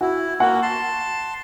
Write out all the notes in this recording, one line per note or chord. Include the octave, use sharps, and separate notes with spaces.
E4 F#4
A#3 F#4 F#5
A5 C6